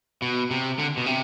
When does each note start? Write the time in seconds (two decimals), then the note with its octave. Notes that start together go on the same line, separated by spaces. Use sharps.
0.22 B2
0.51 C3
0.79 D3
0.97 B2
1.06 C3